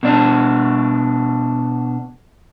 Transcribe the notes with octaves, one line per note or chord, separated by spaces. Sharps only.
B2 D4